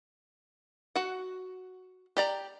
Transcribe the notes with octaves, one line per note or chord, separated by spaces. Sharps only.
F#4 F#5
G4 D5 A#5